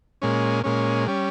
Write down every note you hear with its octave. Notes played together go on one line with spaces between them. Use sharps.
A#2 G#3 C#4
A#2 G#3 C#4
G3 C#4